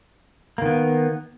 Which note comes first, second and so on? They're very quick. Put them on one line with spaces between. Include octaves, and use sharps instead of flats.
A#3 D#3 B3